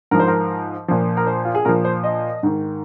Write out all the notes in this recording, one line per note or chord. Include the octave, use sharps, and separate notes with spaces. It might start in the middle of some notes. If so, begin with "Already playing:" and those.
G#2 F3 A#4
C5
A#4
A#2 F3
A#4
C5
F4
G#4
A#2 F3 A#4
C5
D#5
G#2 D#3